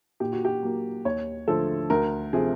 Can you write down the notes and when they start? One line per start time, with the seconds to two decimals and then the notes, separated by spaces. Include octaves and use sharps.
0.20 A#2 G4
0.33 F#4
0.45 G4
0.63 F#3 A#3
1.05 D#2 C#5
1.48 D3 F3 A3 A4
1.90 D2 A#4
2.33 C3 F3 A3 G#4